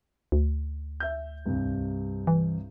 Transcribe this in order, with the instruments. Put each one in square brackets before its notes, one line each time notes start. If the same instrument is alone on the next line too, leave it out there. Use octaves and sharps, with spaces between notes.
[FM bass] D2
[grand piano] E5 G6
C2 G2
[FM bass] E3